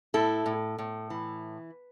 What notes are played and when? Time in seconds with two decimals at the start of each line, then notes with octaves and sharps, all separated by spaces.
0.14 A2 E4 A4
0.46 A2
0.78 A2
1.10 E3